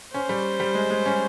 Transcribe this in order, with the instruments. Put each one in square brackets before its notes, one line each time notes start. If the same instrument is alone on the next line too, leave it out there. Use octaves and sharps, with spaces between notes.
[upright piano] C#4 [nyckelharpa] C5
[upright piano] G3
G3
G#3
G#3
C#4